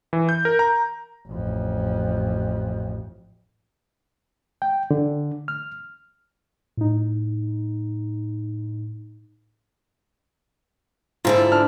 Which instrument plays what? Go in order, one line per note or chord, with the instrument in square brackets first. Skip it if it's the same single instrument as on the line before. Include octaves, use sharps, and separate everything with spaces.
[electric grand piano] E3
G6
A#4
A#5
[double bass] A1 F2
[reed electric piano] G5
D3
F6
[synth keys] A2 D#4
[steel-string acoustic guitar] G#2 D3 E4 [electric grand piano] F4
[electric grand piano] D4 A5 F6